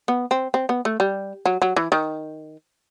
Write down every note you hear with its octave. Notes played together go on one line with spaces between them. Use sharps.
B3
C4
C4
B3
A3
G3
F#3
F#3
E3
D#3